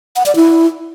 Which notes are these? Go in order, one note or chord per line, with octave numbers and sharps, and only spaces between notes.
F#5
D5
E4